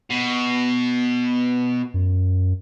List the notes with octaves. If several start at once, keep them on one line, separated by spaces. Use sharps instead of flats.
B2
F#2